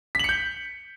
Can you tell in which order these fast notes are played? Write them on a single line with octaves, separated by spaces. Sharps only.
B6 F#7 C#7 G6